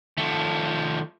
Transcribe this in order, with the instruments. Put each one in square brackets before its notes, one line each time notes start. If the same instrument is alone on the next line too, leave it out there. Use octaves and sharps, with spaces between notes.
[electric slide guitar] D#3 A4 [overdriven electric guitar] F3 A3